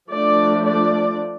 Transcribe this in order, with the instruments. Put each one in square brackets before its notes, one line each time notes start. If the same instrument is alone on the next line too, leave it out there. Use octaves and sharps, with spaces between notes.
[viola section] F3 A3 D4 D5
D5